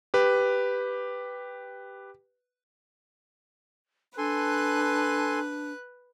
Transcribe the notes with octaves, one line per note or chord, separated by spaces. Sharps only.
G4 B4
D4 A4 B4 G#5 C6 F#6